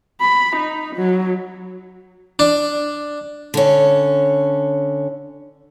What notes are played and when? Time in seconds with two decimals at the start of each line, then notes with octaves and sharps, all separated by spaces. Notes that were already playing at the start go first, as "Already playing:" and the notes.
0.21 B5
0.56 D#4
0.96 F#3
2.39 D4
3.54 D3 C#4